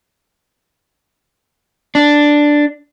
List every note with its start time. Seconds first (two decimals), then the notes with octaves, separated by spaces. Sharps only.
1.95 D4